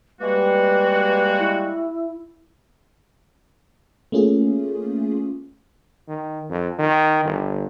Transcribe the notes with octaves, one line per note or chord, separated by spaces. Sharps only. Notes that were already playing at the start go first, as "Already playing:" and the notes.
G3 G#3 A#3 F#4 B4
E4
A3 A#3 C#4 F4 G#4
D#3
F2
D#3
G1